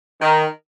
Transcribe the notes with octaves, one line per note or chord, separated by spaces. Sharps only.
D#3